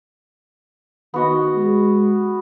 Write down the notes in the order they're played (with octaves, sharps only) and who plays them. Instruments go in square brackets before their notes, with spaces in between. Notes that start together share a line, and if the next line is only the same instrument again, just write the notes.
[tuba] D#3 [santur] B3 F#4 D#5
[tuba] G#3